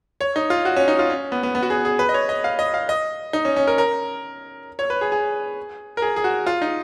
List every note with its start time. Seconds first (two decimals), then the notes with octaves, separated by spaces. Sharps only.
0.21 C#5
0.36 D#4
0.50 F4
0.65 F#4
0.76 C#4
0.88 D#4
0.99 F4
1.10 C#4
1.32 B3
1.43 B3
1.55 B3
1.63 F#4
1.70 G#4
1.85 G#4
1.99 B4
2.09 D#5
2.14 C#5
2.29 D#5
2.44 F5
2.59 D#5
2.74 F5
2.89 D#5
3.33 D#4
3.45 C#4
3.56 C#4
3.67 A#4
3.78 A#4
4.79 C#5
4.90 B4
5.01 G#4
5.12 G#4
5.97 A#4
6.02 G#4
6.16 G#4
6.24 F#4
6.46 F4
6.62 D#4